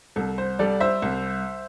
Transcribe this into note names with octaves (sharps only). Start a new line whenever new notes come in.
C2 A4
C5
G3 A4 D5
C5 E5
C2